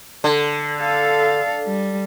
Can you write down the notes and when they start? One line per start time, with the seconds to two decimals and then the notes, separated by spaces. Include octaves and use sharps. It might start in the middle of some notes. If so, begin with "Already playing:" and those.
0.24 D3
0.79 A4 F5
1.67 G3